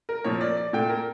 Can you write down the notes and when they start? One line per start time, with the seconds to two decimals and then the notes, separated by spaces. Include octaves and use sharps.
0.09 A#4
0.24 A#2 F3 A#3 C#5
0.41 D5
0.57 D5
0.73 A#2 A3 G5
0.89 A#4